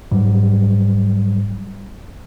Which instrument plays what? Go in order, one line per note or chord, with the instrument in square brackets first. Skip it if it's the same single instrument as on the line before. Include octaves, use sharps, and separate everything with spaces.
[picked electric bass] G#2 F#3 G3